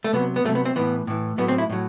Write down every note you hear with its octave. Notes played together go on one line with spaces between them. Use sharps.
A3
C3 F#3 B3
B3
C3 F#3 A3
B3
C4
A2 E3 B3
A2 E3
A2 F#3 B3
C4
E4
A2 F#3